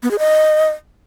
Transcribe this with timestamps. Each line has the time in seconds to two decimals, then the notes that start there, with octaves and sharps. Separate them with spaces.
0.03 B3
0.11 G#4
0.19 D#5